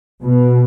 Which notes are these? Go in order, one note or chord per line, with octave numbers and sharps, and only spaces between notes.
B2